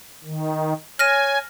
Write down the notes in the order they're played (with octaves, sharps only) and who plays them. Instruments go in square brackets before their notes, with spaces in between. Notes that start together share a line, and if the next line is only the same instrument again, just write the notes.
[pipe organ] D#3
[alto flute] C#5 [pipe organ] G#5 [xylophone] F6 A#6 D#7